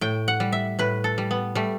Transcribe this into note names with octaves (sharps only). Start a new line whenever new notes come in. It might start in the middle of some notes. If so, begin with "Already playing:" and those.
A2 G5
F#5
G3
E5
A2 B4
A4
G3
B3
G3 A3